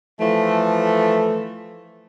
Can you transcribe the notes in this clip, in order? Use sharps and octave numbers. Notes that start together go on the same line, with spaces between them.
E3 F3 A3